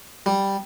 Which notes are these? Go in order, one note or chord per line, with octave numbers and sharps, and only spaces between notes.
G3